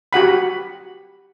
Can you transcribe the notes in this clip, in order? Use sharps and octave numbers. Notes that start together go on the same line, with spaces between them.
F#4 G4 F#5 B5